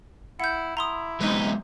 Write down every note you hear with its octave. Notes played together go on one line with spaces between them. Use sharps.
E4 F#5 G6
E4 A#5 C6 D#6
C3 F#3 G#3 B3 D#4 B4